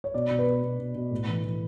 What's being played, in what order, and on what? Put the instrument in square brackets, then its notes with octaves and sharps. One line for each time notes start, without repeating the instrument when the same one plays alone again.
[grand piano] C#5
B2 D5
B2
B4
B2
B2
B2
B2
A2
E3
E3